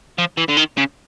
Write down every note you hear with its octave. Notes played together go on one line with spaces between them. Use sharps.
F3
E3
D3
D#3
C#3